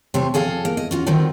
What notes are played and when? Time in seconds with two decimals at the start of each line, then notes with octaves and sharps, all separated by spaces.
0.14 C3 A3 C5 C#5
0.34 F2 G#4 A4 F5
0.65 A#3
0.77 D#5
0.91 C#4 F4 F#4
1.06 D3 D#3 F#3 C4 F4